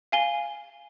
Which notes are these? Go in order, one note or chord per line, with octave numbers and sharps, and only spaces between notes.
F5 G#5 G7